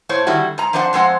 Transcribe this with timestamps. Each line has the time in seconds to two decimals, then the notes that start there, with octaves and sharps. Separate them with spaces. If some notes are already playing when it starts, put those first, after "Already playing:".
0.09 A2 C5 C#5
0.27 D3 D#3 G3 E4 F#4
0.58 G#2 A#5
0.73 F3 C4 D4 C5 F5 F#5
0.93 F2 G#3 C4 C5 F#5